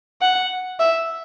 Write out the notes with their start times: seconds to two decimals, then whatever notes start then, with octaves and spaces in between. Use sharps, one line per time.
0.21 F#5
0.80 E5